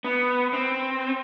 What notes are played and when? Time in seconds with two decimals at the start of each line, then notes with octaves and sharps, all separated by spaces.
0.04 B3
0.53 C4